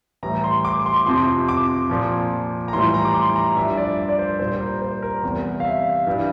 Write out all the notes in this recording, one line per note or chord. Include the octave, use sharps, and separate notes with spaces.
A2 E3 G3 A#5
C6
D6
C6
D6
F2 C3 F3 C6
D6
A#2 F3
A#5
A2 E3 G3 C6
A#5
D6
C6
A#5
G2 F3 E5
D5
D5
D5
C5
A#2 G3 C5
C5
A#4
C5
A#4
E2 C3 G3
F5
E5
G2 E3 G3